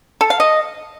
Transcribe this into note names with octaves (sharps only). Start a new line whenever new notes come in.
A4
F5
D#5